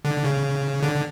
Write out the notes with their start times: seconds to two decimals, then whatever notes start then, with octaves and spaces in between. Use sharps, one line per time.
0.05 D3
0.24 C#3
0.83 D3